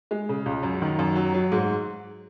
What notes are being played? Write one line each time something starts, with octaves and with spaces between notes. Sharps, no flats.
G#3
C#3
C#2
F#2
D#3
F#2
F#3
F#3
G#2